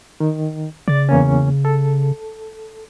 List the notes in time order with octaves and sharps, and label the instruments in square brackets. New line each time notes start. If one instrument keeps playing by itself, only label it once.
[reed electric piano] D#3
[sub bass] C#3 [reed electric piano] D5 A6
[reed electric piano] E2 A#3 C#4
A4